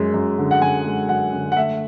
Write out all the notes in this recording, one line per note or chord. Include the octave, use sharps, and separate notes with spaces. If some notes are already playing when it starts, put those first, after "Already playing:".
Already playing: F#2 G#3
F#2
D3
F#5
F#2 G#5
G#3
F#2 F#5
D3
F#5
A3 E5